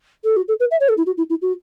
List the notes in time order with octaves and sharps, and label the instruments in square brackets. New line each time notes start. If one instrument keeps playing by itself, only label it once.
[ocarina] A4
F#4
A4
B4
E5
C#5
A4
E4
F#4
E4
E4
F#4